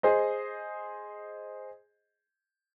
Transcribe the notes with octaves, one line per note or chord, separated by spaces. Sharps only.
G#4 C5 D#5